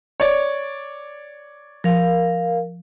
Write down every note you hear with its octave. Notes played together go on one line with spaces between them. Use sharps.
C#5 D5
F3 A#4 F5